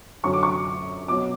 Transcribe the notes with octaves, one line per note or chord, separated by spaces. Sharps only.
F#2 D3 F#3 C#6
D6
C#6
B2 F#3 D6